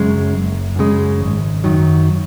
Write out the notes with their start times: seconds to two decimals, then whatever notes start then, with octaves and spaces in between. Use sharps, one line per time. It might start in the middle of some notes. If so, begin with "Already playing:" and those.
Already playing: F#2 C#3 G#3
0.33 F#1
0.76 F#2 C#3 G#3
1.20 G#1
1.64 F#2 D#3 F#3